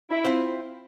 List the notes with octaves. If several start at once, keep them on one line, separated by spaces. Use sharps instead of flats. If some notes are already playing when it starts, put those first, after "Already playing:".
E4
C4 F4 C5